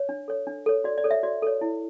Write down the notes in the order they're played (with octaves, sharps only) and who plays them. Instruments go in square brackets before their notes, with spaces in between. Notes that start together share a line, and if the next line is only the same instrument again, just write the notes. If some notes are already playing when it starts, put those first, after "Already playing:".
Already playing: [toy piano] C#5
D4
A4 C#5
D4
A4 C#5
F#4 D5
D5
A4 C#5
E5
F#4 D5
A4 C#5
E4